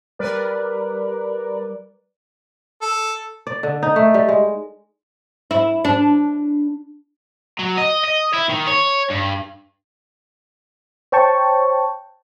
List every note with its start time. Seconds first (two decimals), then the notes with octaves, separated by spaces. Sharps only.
0.19 G3 A#4 B4 D5
2.82 A4
3.47 D5
3.63 D3
3.83 D#4
3.96 A3
4.14 G3
4.29 G#3
5.51 E4
5.85 D4
7.59 F#3
7.77 D#5
8.04 D#5
8.33 E4
8.49 D#3
8.67 C#5
9.10 G2
11.12 C5 C#5 G5 A5 C#6